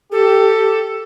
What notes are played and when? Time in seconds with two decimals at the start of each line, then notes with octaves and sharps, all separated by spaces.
0.12 G4 A4